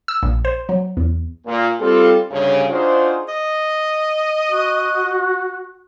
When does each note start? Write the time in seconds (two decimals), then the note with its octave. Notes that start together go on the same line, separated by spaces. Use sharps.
0.08 E6
0.23 A#1
0.45 C5
0.69 F#3
0.97 E2
1.46 A#2
1.80 G3 C4 F4 A4
2.30 D2 G2 C#3
2.69 D4 D#4 F4 F#4 G#4 C5
3.28 D#5
4.51 F#4